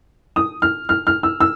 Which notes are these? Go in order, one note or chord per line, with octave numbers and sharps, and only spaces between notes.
D#6
F6
F6
F6
E6
E6